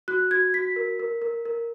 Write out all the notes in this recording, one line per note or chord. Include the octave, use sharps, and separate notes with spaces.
F#4 F#6
F#4 G#6
F#4 B6
A#4
A#4
A#4
A#4